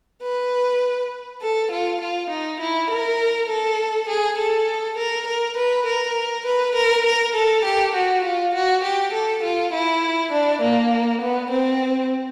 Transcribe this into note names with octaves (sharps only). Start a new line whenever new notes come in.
B4
A4
F4
F4
D#4
E4
A#4
A4
G#4
A4
A#4
A#4
B4
A#4
B4
A#4
A#4
A4
G4
F#4
F4
F#4
G4
A4
F4
E4
D4
A#3
B3
C4